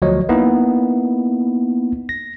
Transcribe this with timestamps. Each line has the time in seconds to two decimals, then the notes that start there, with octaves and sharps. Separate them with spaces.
0.02 D2 F3 F#3 C#5 D#5
0.29 A#3 B3 D#4 E4
2.09 A#6